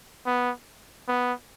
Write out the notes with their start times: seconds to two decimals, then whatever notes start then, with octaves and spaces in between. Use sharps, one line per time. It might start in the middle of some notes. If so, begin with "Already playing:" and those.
0.26 B3
1.08 B3